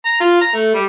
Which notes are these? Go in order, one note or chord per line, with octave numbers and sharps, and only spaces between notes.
A#5
F4
A#5
A3
G3